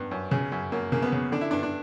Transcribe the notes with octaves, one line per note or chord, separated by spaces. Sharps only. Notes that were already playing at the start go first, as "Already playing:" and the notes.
Already playing: G2 B3
F#2
C#3
F#2
F#2 A#3
C#3 A#3
B3
C#3
D3 D4
E4
G2 D4
D4